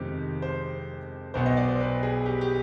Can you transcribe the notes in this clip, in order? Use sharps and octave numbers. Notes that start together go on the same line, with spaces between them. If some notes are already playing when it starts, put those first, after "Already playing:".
Already playing: F2 C3 D#3 G#3 G4
C5
B1 B2 B3 C5
D#5
D5
C5
B4
G#4
G4
G4